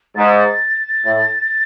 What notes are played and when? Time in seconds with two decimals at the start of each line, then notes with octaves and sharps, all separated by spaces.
0.15 G#2 A6
1.05 A2